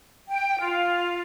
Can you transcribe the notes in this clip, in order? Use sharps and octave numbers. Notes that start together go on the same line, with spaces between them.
G5
F4